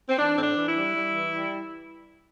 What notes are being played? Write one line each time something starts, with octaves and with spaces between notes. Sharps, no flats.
C4
E3 D4
A2 C4
D4
E3
E4
G3
G3
E3
G3